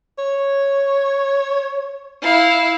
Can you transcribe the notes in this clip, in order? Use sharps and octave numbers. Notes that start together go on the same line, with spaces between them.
C#5
E4 F5